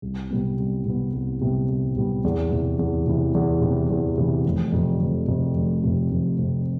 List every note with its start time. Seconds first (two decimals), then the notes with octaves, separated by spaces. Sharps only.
0.02 C2
0.30 C3 G3 B3
0.59 C2
0.85 C3 G3 B3
1.13 C2
1.41 C3 G3 B3
1.69 C2
1.96 C3 G3 B3
2.24 E2
2.51 C3 E3
2.79 E2
3.07 C3 E3
3.34 E2
3.61 C3 E3
3.90 E2
4.18 C3 E3
4.45 F1
4.72 F2 C3
5.00 F1
5.28 F2 C3
5.55 F1
5.83 F2 C3
6.11 F1
6.39 F2 C3